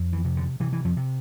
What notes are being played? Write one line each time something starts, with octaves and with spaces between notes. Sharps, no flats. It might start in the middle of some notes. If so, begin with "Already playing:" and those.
Already playing: F2
E3
C3
D3
C3 E3
E3
F2 F3
C3